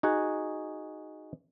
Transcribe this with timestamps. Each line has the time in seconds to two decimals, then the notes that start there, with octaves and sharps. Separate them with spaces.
0.03 D#4 F#4 G#4 F#5